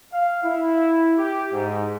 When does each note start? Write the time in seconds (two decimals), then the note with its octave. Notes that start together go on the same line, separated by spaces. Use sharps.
0.12 F5
0.43 E4
1.17 G4
1.52 G#2